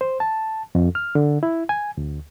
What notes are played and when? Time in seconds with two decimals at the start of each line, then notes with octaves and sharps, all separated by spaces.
0.01 C5
0.20 A5
0.75 F2
0.95 F6
1.15 D3
1.43 E4
1.69 G#5
1.97 D2